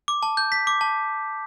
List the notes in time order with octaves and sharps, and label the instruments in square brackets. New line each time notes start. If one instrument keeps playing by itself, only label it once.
[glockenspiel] D6
A5
G6
B6
D6
A5